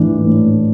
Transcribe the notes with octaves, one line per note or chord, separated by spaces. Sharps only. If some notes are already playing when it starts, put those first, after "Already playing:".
Already playing: A2 E3 D4
A2